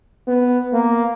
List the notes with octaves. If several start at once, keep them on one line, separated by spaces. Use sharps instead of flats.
B3
A#3